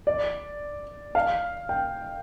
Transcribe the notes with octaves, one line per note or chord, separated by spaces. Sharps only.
D5
F5
G5